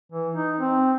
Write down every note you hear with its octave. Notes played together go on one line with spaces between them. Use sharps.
E3
D#4
C4